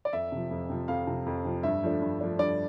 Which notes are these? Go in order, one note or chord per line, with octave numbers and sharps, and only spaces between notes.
D5
F2 E5
C3 F3
F2
C3 F3
F2 F5
C3 F3
F2
C3 F3
G2 E5
F3 A3 D4
G2
F3 A3 D4
G2 D5